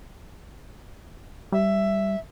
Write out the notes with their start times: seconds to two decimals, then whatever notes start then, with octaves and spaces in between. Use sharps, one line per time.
1.52 G3 E5